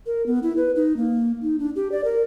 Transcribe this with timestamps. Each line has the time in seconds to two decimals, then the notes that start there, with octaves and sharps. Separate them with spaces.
0.06 A#4
0.26 B3
0.43 E4
0.57 B4
0.76 D#4
0.97 A#3
1.42 D#4
1.59 D4
1.76 G4
1.92 D5
2.04 A#4